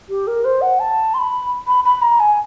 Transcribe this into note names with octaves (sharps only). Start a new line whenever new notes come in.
G4
A#4
C5
F#5
A5
C6
B5
B5
B5
A#5
G#5